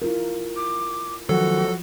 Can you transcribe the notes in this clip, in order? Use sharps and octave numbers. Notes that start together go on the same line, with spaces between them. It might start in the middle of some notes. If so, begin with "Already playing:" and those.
E4 F4 A#4
D6
D#3 F3 F#3 F#4 A4